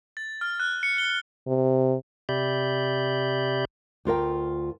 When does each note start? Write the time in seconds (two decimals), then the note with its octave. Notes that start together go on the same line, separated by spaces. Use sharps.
0.17 A6
0.41 F6
0.60 F#6
0.83 C#7
0.98 G7
1.47 C3
2.29 C3 G4 D5 E5 B5 G6
4.05 D2 F4 A#4 G5